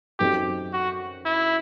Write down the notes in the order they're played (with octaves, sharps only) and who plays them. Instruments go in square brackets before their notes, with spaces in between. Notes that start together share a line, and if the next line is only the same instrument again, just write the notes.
[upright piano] F#2 F#3 C4 D#4 A4 [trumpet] G4
[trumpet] F#4
E4